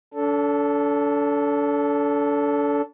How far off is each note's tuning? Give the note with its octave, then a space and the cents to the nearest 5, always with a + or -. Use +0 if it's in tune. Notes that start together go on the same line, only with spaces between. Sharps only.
D4 -40 A4 +0